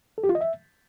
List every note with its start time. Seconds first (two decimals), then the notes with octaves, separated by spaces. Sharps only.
0.18 A4
0.24 G4
0.29 F4
0.35 D#5
0.41 E5